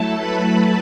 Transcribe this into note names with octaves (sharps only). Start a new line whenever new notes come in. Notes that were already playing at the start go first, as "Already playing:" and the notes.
Already playing: F#3 A3 E4 A4 A5
B4 B5